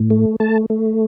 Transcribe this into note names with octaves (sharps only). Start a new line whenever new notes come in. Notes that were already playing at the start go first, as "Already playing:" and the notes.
Already playing: A2
A3
A3 A5
A3